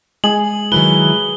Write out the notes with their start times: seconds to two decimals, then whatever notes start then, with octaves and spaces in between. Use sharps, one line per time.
0.24 G#3 G#4 F#7
0.72 D#3 F#3 E4 B4 G7